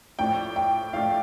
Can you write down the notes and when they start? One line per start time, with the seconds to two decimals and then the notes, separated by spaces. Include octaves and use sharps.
0.19 A2 F3 A3 D4 G5
0.56 G5
0.93 A2 F3 A3 D4 F5